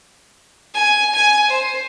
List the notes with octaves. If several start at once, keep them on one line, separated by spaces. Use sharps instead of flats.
G#5
G#5
C5